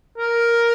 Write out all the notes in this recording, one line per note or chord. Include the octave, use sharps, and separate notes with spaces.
A#4